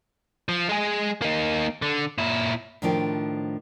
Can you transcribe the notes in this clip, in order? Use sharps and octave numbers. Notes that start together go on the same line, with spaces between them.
F3
G#3 G#4
A#3 D#4
D3
A#2 E4
A2 D#3 F3 D4 C5 G5